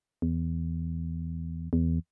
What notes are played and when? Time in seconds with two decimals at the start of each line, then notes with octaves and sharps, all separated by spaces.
0.22 E2
1.73 E2